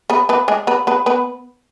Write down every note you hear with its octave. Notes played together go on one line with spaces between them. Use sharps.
B3 B4
B3 B4
G#3 G#4
B3 B4
B3 B4
B3 B4